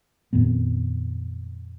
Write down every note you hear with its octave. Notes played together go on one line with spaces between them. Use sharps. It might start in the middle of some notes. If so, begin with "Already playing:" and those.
F2 A#2 D#3 B3